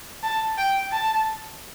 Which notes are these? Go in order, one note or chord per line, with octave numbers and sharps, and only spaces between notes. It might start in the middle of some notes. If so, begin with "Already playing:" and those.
A5
G5
A5